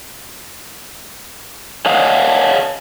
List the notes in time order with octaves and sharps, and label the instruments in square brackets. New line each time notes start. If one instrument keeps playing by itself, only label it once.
[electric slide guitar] C#5 D#5 F5 F#5